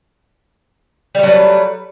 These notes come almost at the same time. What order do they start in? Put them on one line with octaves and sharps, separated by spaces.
G3 A3 F#3 B4